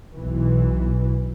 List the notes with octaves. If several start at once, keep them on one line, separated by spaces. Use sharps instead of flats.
B1 E3